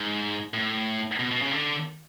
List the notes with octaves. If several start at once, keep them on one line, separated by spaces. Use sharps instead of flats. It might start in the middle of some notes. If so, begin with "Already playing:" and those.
Already playing: G#2
A2
B2
B2
C#3
D3